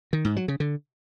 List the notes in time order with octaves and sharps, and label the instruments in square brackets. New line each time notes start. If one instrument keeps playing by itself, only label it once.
[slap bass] D#3
G#2
F#3
C#3
D3